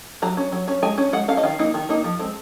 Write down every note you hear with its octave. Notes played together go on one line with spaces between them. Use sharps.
F#3 A#5
C#4
F#3
C#4
G#3 G#5
C#4
G#3 F#5
C#4 F5
D#5
D#3 F5
A#3 D#4
D#3
A#3 D#4
F3
G#3 C4